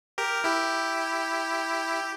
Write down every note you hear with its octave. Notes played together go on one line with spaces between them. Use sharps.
G4 A#4
E4 G4